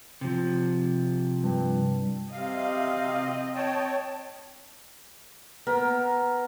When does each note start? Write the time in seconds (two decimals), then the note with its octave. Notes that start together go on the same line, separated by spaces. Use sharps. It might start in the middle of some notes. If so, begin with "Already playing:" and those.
0.21 C3 F3
1.44 G2
2.32 C3 C4 D#5 F5
3.55 C#5 G5 A5
5.67 B3 A#4